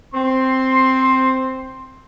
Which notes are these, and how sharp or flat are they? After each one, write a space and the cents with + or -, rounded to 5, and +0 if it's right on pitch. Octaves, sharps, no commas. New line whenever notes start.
C4 +0 C6 +10